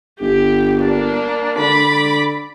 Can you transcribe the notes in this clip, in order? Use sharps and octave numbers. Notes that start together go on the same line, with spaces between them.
G1 G4
A#3 D4
D3 D5 B5 D6